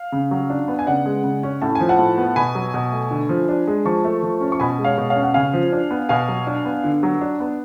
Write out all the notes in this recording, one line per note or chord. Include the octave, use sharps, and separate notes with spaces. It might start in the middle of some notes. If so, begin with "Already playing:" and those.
Already playing: F5
C#3
F#3
D4
B3
G#5
C#3 D5 F#5
G#3
C#3
C#4
A2 A5
F3 G#5
F#5 A5
A2
B3
B2 G#5 B5
F#3
B2
A3
D3
F3
D4
G#3
F3 A5 C#6
A3
F3
C#4
C#6
B2 G#5 B5
G#3
C#5 F5
B2
C#5 F5
C#4
F#5
C#3 F5 G#5
F3
D4
B3
B2 F5 G#5
F#3
D4
B3
D3
F#3
D4
B3